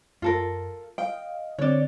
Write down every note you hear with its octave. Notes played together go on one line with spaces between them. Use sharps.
F#2 F4 A4 A#4
D#5 F5 G5
D3 C4 C#5 D5